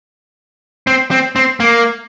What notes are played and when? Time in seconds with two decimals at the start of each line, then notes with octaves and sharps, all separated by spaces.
0.87 C4
1.11 C4
1.36 C4
1.60 A#3